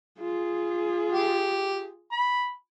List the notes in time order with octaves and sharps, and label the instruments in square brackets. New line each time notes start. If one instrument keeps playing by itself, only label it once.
[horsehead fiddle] F4 G#4
[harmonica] G4
B5